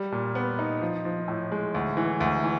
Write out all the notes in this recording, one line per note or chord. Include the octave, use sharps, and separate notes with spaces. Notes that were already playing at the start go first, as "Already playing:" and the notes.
Already playing: G3
A#2
B3
D#4
F3
F3
A2
G#3
D2
E3
D2
E3